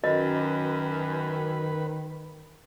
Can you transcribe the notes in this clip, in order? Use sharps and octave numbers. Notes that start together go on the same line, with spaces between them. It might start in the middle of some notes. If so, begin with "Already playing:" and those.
F#2 D#3 B4 D#5